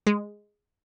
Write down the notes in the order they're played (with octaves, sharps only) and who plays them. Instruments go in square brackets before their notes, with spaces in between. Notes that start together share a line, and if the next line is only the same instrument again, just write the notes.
[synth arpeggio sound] G#3